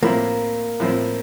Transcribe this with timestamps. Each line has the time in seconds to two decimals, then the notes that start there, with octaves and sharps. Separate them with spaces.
0.03 A2 F3 A#3 C4 E4
0.80 A2 F3 C4 E4